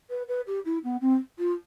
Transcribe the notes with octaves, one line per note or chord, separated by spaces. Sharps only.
B4
B4
G4
E4
B3
C4
F4